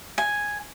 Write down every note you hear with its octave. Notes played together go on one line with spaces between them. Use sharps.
G#5